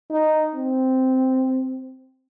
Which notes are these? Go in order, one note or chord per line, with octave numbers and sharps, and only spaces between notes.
D#4
C4